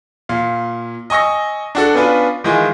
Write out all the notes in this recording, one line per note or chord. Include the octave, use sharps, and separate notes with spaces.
A#2 F5
D#5 G#5 C#6 E6 A#6
D4 F#4 A4
B3 C#4 D4 F4 B4
D#3 E3 G#3 F4